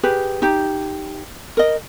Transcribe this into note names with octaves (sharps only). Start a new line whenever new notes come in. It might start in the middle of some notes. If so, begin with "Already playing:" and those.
G4 G#4 B4
D#4 G4
A#4 D#5